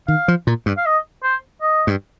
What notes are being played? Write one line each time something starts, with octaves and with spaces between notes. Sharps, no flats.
D#3 F5
F3
A#2
G2
F5
D#5
C5
D#5
G2